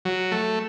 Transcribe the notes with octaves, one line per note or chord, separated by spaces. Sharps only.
F#3
A3